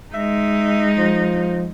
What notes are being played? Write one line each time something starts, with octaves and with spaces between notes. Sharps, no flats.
G#3 D#4 E5
F3